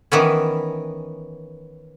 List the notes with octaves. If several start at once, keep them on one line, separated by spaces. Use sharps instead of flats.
D#3 E3 B3 C#4